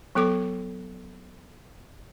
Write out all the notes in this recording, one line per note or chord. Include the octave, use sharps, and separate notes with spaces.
F#3 B3 A4 D6